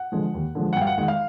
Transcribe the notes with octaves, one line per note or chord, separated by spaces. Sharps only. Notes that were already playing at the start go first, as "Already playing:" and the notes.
Already playing: F#5
D3 F3 G#3
D#2
D3 F3 G#3
F#5
G2 G5
F5
F#5
D#3 G#3 F#5
F5